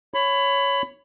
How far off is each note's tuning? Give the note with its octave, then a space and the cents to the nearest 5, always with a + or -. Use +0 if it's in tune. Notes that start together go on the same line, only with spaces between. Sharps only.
C#5 +0 B5 +20